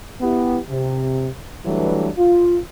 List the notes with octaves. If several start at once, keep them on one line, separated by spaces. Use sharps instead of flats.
B3 E4 G4
C3
E3 F#3 G3 A3 D4 B4
F4